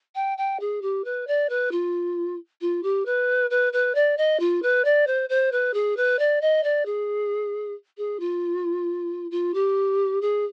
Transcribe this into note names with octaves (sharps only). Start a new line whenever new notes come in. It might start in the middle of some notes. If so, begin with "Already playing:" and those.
G5
G5
G#4
G4
B4
D5
B4
F4
F4
G4
B4
B4
B4
D5
D#5
F4
B4
D5
C5
C5
B4
G#4
B4
D5
D#5
D5
G#4
G#4
F4
F4
G4
G#4